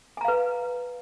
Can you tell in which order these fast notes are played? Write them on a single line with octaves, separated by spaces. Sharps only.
G#5 A#5 F5 B4